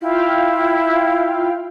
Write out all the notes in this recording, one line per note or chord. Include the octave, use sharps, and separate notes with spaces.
E4 F4 F5 G5